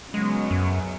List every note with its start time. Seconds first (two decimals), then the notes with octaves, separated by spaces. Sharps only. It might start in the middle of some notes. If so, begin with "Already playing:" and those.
0.14 C#3 F#3 G#3 B3
0.51 F#2